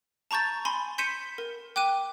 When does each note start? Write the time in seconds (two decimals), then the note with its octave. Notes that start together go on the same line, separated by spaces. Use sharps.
0.31 A5 A#5 C#6 G6 A6
0.65 G#5 B5 C6
0.98 C6 G6 B6 C#7 D#7 E7
1.38 A#4
1.76 G5 D6 F#6 D#7